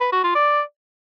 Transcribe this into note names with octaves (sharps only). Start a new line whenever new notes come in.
B4
F#4
F4
D5